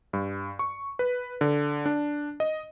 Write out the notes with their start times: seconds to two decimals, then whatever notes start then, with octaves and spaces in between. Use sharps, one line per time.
0.13 G2
0.59 C#6
0.99 B4
1.41 D3
1.86 D4
2.40 D#5